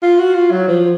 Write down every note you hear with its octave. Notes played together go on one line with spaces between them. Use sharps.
F4
F#4
F4
F#3
F3